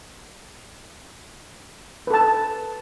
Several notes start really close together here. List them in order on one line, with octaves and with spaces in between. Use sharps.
B4 A4 A5